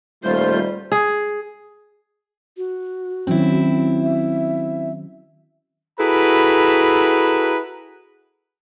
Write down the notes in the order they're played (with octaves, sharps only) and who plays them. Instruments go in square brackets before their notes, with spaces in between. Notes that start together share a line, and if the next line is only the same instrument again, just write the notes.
[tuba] D#1 [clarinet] G3 [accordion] A3 F4 G6 [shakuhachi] C5
[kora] G#4
[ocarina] F#4
[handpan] D#3 F#3 C#4 [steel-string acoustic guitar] C4 E4
[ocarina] E5
[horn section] E4 F#4 G#4 A4 B4 A#5